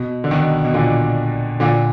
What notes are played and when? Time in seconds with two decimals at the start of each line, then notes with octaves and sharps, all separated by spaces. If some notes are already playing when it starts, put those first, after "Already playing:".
Already playing: B2
0.24 D3
0.31 B2 D#3
0.65 B2
0.74 A#2 D3
1.60 A#2 D3